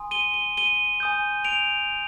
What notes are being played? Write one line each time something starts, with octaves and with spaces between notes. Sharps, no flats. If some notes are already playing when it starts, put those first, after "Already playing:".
Already playing: G#5 C6 D#6
D#7 G7
G7
D#7 G7
G#5 D#6 G6
D7 F7